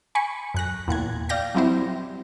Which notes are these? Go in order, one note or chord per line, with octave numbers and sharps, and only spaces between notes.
G#5 B5 C#6
F#2 F#6 A#6
E2 A#2 F#6 G#6
D5 F5 G5 A#6
F#3 G3 C4 E4 G4 C5